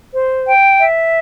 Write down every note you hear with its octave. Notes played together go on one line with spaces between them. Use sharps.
C5
G5
E5